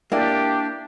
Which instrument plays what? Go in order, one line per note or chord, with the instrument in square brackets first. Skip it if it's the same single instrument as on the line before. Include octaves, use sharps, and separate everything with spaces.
[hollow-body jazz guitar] A#3 [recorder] D4 [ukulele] E4 D5 G5 [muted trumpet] G4